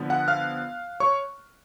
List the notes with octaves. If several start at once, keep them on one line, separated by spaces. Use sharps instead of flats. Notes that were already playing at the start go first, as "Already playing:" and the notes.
Already playing: D3 F3 B3
F#5 F#6
F5 F6
C#5 C#6